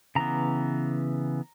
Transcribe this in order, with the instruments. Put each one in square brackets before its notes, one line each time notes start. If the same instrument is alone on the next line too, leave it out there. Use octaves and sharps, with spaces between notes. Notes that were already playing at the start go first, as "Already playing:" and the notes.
[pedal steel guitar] C#3 E3 B3 A#5